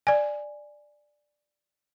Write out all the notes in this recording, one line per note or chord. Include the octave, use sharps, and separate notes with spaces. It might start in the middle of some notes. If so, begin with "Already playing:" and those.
D5 G#5